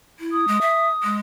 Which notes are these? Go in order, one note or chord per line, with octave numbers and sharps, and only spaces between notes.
E4
D#6
G#3
E5
G#3